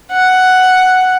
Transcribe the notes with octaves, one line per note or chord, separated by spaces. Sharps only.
F#5